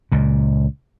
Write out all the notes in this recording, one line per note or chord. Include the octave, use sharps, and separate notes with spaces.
C#2 A#2